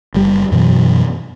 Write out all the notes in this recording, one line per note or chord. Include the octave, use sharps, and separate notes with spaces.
F#1 G3
F#2 B2 E3 F#3